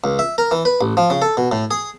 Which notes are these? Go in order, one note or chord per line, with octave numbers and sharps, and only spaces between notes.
C#2
E5
A#4
E3
B4
A1
F3
C#3
A4
B2
A2
G#4